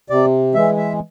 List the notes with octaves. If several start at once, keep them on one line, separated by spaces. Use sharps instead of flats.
C3 D5
E3 G#3 E5
E5